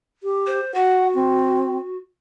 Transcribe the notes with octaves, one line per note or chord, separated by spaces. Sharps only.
G4
C5
F#4 F#5
C4